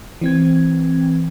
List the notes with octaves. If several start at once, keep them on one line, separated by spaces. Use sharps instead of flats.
E3 C4 G#6